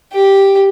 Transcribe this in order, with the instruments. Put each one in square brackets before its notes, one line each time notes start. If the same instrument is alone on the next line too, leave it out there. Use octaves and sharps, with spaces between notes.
[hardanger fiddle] G4